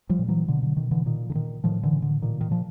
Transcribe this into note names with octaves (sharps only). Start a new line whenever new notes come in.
F3 G3
A#2
E3 F#3
B2 D3
D3
B2 D#3
D3 E3
A#2 D#3
D3
A#2 D#3
A2 D#3 F3
D3 E3
A2
D3
A#2 D#3
D#3
A#2 F3